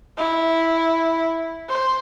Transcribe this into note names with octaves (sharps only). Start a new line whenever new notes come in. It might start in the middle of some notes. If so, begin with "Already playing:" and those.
E4
C5